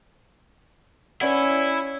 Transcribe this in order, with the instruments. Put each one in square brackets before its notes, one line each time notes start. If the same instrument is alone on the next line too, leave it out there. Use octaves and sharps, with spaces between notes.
[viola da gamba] C#4 [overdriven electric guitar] E4 [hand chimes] B4 D5 F#5